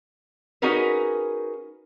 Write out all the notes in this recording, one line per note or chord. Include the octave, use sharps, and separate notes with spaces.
C#4 D#4 F#4 G#4 A#4 B4